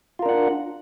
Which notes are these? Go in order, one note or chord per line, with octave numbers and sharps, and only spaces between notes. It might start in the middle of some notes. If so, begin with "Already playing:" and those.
D4 F4 A#4 F#5